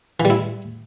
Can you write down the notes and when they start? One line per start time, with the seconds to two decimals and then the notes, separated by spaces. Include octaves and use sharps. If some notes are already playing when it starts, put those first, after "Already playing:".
0.20 E3
0.25 G3
0.30 E4